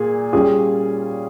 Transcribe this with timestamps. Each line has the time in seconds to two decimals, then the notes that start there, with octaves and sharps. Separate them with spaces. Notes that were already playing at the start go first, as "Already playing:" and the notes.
Already playing: A#2 G#4
0.33 G3 C#4 F4 G#4